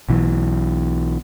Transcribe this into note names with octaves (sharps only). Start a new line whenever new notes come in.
B1 B2 E3 F#3